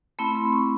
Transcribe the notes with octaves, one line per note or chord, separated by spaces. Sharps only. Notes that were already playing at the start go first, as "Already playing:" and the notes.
A3 C4 E4 B5
C6
C#6